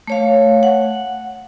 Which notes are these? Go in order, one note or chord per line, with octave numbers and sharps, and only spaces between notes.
A3 C#5 F5
F#5